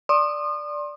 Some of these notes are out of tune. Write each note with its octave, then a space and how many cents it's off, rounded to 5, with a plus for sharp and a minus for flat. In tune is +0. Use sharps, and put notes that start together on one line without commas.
D5 +0 C6 +30 D#6 -35